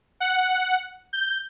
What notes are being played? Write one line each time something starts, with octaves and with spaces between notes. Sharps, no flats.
F#5
G6